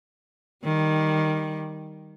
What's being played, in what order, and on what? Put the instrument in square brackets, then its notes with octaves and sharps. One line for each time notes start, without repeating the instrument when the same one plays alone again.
[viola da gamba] D#3 G3